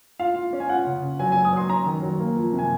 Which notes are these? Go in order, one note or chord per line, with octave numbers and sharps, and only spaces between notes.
F4 F5
F4
C#4
G#5
F4 F#5
C#3
C#3
F#3 G#5
G#5
F#3
D#6
F#3 C6
C#4 A#5
D#3
F#3
A#3
F3
C3
G#5